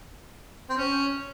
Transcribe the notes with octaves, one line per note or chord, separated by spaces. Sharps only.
C4
C#4